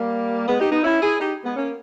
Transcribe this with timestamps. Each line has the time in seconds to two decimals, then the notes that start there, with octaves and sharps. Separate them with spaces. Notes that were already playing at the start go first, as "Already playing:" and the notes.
Already playing: G3 A#3
0.47 G#3 B3
0.59 D#4 G4
0.71 B3 D#4
0.83 C#4 E4
1.01 E4 G#4
1.20 D#4 G4
1.43 G#3 B3
1.55 A#3 C#4